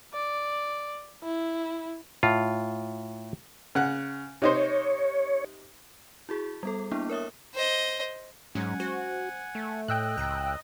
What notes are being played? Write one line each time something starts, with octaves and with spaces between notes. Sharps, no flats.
D5
E4
A2 F4
C#3 F#5
C3 D#4 C5 C#5
E4 F#4 G#4
G3 B3 A4
A#3 B3 D4 E4
A#4 C#5 E5 D#6
C5 D#5
G#2 F#3 G#3 C#4 F#5 G#5
F#4 C5
A3
A2 D#5 G5 E6 F#6
C#2 A#5